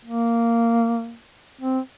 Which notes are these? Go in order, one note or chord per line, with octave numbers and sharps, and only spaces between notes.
A#3
C4